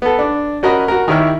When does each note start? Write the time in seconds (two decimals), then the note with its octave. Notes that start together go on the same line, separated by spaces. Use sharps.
0.02 B3 A4
0.19 D4
0.63 C#4 F#4 A#4 D#5 B5
0.88 F#4 A#4
1.08 D#3 E4 G4 C#5 E5 F6